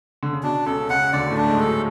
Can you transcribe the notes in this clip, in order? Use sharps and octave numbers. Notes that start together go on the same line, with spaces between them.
D3
C#3
B2 D4
C#2 C#3 A4
C#2 C#3 F#5
D2 D3 D5
A2 A3
D4
A3
G#2 G#3
A4
F#3